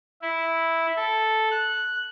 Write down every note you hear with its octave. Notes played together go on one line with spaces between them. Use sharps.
E4
A4
F#6